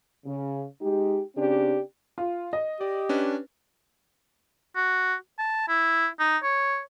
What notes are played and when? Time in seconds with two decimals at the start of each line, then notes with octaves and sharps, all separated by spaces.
0.25 C#3
0.81 G#3 D#4 G4
1.36 C#3 C4 D4 G4 D5
2.18 F4
2.53 D#5
2.81 G4 D5
3.09 C#4 D4 B4
4.76 F#4
5.39 A5
5.69 E4
6.20 D#4
6.43 C#5